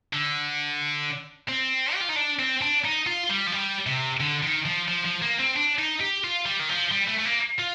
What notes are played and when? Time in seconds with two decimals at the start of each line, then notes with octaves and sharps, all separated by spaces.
0.13 D3
1.49 C4
1.95 G4
2.01 F4
2.09 D#4
2.16 D4
2.39 C4
2.62 D4
2.85 D#4
3.07 F4
3.30 G3
3.47 F3
3.52 G3
3.86 C3
4.20 D3
4.43 D#3
4.66 F3
4.88 F3
5.05 F3
5.22 A#3
5.39 C4
5.56 D4
5.79 D#4
6.01 G4
6.24 F4
6.46 G3
6.60 D#3
6.69 F3
6.92 G3
7.08 A3
7.19 A3
7.25 A#3
7.59 F4